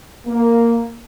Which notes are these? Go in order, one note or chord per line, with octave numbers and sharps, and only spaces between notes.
A#3